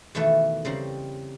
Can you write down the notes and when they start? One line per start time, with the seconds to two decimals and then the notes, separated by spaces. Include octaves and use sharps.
0.15 E2 B2 D#3 A3 B4 E5
0.65 C#3 G3 C4 A#4